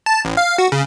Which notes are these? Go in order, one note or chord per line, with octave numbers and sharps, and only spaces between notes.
A5
A1
F5
F#4
C#3